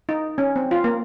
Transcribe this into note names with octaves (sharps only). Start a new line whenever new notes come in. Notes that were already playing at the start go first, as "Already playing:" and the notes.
D#4
C#4
C4
F4
A#3